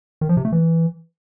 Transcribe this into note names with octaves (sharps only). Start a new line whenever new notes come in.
D#3
F3
C3
A3
E3